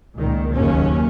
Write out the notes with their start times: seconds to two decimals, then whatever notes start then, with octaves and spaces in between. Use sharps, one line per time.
0.16 C#2 A#2 D#3
0.54 F#1 D#2 C#3 C#4